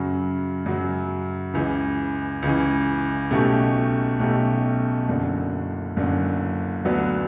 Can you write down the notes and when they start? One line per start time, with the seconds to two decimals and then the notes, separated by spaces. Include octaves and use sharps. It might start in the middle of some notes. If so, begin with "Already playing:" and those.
Already playing: F#2 C#3 F#3
0.66 F#2 C#3 F#3
1.54 C#2 C#3 E3
2.42 C#2 C#3 E3
3.31 B1 B2 A3 C#4 G4
4.19 B1 B2 A3 C#4 G4
5.08 F#1 F#2 D3
5.96 F#1 F#2 D3
6.85 D2 D3 F#3 B3